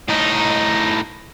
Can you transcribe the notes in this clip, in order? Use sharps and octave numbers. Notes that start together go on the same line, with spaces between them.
A2 D#4